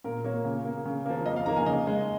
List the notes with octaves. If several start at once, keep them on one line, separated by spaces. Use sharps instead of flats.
A#2 A#4
A#3 C#5
C#3
A#3
C#3
F3 A#3
F2 D#5
F5
D#3 A#3 A#5
G#5
C#3 D#5
G#3